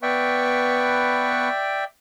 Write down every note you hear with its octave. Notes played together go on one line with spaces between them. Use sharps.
B3 B4 D5 E5 G5 C#6